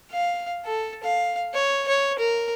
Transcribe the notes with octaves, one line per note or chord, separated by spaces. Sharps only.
F5
A4
F5
C#5
C#5
A#4